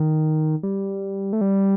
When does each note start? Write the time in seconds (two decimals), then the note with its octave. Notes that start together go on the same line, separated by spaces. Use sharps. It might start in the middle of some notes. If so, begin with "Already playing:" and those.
Already playing: D#3
0.63 G3
1.33 A3
1.41 G3